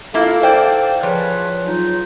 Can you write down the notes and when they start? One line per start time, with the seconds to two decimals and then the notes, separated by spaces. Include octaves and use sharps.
0.14 A#3 E4 F4 A4 F5
0.43 C5 D5 G5
1.03 F3 G#4 B4 C#5
1.66 F#3 D#4 F4